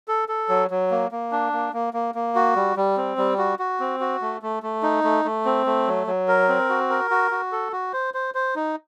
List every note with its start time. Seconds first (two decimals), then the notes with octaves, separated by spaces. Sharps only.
0.08 A4
0.29 A4
0.49 F#3
0.70 F#3
0.91 A#3
1.12 A#3
1.32 D4
1.53 A#3
1.73 A#3
1.94 A#3
2.15 A#3
2.35 F#4
2.56 G3
2.77 G3
2.97 C4
3.18 G3
3.38 F#4
3.59 F#4
3.80 C4
4.00 F#4
4.22 A3
4.42 A3
4.63 A3
4.83 D#4
5.04 A3
5.25 A3
5.45 C4
5.66 A3
5.87 F#3
6.07 F#3
6.28 A#4
6.49 C4
6.69 F#4
6.90 A#4
7.11 F#4
7.31 F#4
7.52 A4
7.72 F#4
7.93 C5
8.14 C5
8.35 C5
8.56 D#4